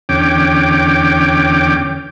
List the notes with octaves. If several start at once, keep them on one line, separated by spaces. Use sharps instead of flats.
E2 D3 C#4 G5 D6